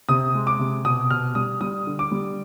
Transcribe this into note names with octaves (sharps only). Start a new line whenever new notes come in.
C3 D#6
G#3
D6
C3
B2 D#6
B2 F6
G3 D#6
G3 D#6
D3
D6
G3